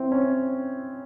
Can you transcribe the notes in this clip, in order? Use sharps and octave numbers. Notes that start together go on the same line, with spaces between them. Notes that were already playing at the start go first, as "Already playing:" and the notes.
Already playing: C4 E4
C#4